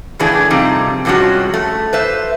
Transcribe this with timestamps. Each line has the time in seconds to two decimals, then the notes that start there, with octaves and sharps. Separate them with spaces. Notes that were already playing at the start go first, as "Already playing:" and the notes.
0.19 A2 C#3 E3 A3 D4 G#4
0.50 C3 F3 G3 C4 D#4
1.05 G2 C3 F3 G#3 C#4 F#4
1.54 A3
1.93 B4 C5 E5